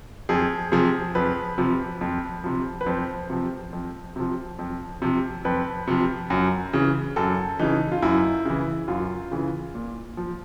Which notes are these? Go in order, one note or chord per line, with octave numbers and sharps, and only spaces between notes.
F2 G#4
C3 F3 G#4
F2 B4
C3 F3
F2
C3 F3
B4
F2 C5
C3 F3
F2
C3 F3
F2
C3 F3
F2 B4
C3 F3
F#2
C#3 E3
F#2 A4
C#3 E3 D#4
F4
F#2 E4
C#3 E3
F#2 F4
C#3 E3
A#2
F3